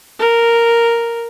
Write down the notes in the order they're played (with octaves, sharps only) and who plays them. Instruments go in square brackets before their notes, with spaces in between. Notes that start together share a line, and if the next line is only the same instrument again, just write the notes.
[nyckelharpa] A#4